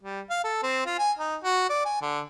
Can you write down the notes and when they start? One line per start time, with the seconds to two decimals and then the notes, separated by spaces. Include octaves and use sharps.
0.03 G3
0.30 F5
0.44 A4
0.63 C4
0.86 F4
0.99 G#5
1.19 D#4
1.44 F#4
1.70 D5
1.85 G#5
2.02 D3